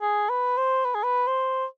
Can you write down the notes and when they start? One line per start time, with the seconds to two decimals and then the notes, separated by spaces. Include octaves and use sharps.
0.02 G#4
0.29 B4
0.57 C5
0.85 B4
0.95 G#4
1.03 B4
1.27 C5